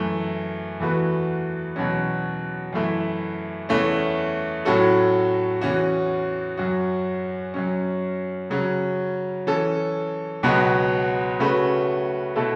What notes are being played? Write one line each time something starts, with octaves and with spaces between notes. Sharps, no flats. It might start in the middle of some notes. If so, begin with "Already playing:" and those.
Already playing: F#2 E3 A3
E2 E3 A3 F#4 B4
E2 B2 F#3 C#4
F#2 E3 A3 E4
E2 E3 A3 C#4
A2 F#3 C#4 F#4 A4
E2 E3 C#4 F#4
F#2 F#3 C#4 F#4
F#2 F#3 C#4
C#3 F#3 C#4
E3 C#4 A4
C#2 B2 F#3 B3 F#4
C#3 A3 C#4 F#4 B4
B2 A3 E4 A4